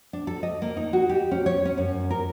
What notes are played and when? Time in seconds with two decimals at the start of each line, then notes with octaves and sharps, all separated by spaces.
0.13 D4
0.27 A4
0.43 D#5
0.62 A#3
0.77 D#4
0.93 F#4
1.09 G4
1.31 C#4
1.46 C#5
1.65 C#4
1.78 F#2
2.10 A#4